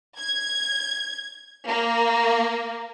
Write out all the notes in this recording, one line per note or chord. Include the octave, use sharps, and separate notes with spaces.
G#6
A#3